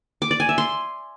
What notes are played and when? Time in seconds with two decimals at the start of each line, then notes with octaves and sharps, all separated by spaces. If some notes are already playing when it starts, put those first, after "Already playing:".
0.22 D6
0.31 D5
0.40 G#5
0.49 E5
0.58 C6